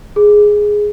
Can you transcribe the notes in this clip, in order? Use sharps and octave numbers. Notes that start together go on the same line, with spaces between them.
G#4